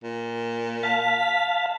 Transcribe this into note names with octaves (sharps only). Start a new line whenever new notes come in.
A#2
F5 A5 B6